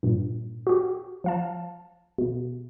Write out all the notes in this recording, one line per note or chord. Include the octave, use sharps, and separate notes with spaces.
G2 A#2
F#4 G4
F3 F5 A5
B2